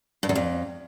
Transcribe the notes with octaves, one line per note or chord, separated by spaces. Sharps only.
G2
E2
F2